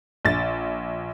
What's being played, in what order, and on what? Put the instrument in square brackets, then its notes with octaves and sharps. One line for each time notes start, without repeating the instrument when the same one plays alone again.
[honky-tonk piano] A#1 A6